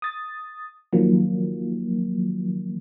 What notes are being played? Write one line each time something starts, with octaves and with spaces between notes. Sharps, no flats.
D#6 A6
D#3 F3 F#3 A#3